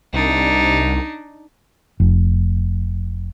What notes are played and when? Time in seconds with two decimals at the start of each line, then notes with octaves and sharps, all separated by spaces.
0.13 C2 D4 D#4
2.00 F1